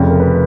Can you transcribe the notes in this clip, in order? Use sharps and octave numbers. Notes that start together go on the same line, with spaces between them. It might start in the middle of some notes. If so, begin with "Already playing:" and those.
Already playing: F1 F2 C#3
A#4
B4